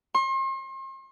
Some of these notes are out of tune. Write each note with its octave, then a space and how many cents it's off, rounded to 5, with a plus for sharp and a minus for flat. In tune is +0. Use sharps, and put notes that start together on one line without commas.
C6 +40